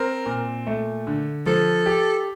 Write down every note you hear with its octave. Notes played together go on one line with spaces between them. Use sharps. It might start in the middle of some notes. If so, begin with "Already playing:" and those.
Already playing: C4 A#4
A#2
A3
D3
F3 A4
G4